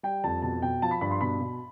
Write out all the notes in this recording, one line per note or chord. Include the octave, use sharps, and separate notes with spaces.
G3 G5
F2 A5
B2 A5
B2 G5
F3 A5
B5
G2 B5
C6
B2 B5
B2